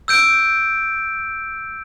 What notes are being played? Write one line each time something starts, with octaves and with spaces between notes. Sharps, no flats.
E6 G6 D7